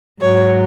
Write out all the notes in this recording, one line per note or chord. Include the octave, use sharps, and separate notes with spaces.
G#2 F#3 C#5